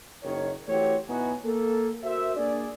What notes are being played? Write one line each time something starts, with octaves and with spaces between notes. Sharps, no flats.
F#1 D#3 C#5
E3 A3 C4 F#4 G4 C#5
B2 B3 D#4 E4 F#4 G#5
A#3 A4
F#4 A#4 C5 E5
A#3 D4 G#4 D5